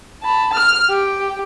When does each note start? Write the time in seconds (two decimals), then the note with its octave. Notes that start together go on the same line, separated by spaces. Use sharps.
0.23 A5 B5
0.54 F6
0.89 G4